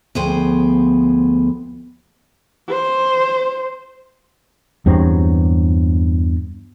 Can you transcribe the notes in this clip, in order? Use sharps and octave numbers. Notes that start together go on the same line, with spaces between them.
D2 F3 B3 G#4 C5 G5
C5
E2 G2 F#3 C4